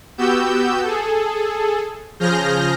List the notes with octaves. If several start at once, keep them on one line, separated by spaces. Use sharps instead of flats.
B3 F#4 G4 E6 G6
G#4 A4
C#3 F3 G#4 F6 G6 A#6